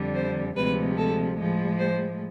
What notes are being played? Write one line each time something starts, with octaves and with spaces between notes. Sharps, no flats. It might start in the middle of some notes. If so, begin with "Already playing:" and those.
Already playing: F2 D3 G3
C5
D2 C3 F3 G#3 B4
A4
A2 F3 G#3
C5